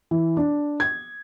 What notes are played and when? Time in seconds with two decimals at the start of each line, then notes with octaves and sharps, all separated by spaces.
0.11 E3
0.37 D4
0.80 G#6